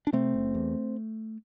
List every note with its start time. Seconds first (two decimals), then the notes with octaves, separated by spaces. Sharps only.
0.07 D4
0.13 C3 A3 C4
0.34 F#1
0.54 E2